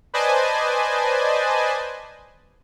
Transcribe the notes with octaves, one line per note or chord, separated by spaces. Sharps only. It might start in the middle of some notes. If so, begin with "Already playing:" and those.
B4 C5 D5 D#5 G#5 A5